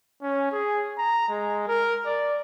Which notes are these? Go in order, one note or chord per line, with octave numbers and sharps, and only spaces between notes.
C#4
G#4
A#5
G#3
A#4
D5